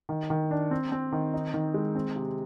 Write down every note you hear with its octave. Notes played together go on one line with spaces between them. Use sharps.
D#3
D#3
D4
C4
C4
D#3
D#4
D#3
G#3
C4
C3